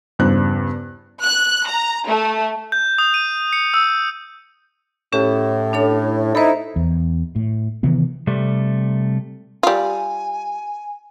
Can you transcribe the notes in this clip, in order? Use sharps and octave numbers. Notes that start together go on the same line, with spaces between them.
E2 G2 C#3 C5 F#6
F#6
A#5
A3
G6
D#6
D#7
C#7
E6
A2 C#4 G4
D4 A4 C#5
D#4 E4 A4 C5
E2
A2
C3 D#3 E3 B3
C3 G3 A3
G3 F4 G#5